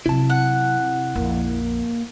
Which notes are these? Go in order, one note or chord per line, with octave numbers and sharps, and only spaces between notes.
C3 F#3 E4 A5
F#5
C3
A#1 F2 A#3